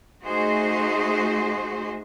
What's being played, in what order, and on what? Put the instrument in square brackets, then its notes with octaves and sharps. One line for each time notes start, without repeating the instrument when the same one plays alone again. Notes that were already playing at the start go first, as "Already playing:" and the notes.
[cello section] A3 D#4 F#4 G#4 C5 D#5